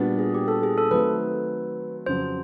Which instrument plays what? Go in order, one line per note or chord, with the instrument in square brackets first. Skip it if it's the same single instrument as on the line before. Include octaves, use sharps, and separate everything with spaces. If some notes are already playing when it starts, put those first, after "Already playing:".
Already playing: [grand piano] A#2 G3 B3 D4 F#4
[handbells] G#4
G4
A4
G#4
A4
[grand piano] D#3 F#3 A3 C4 [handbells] B4
[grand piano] F2 C#3 F#3 [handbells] C5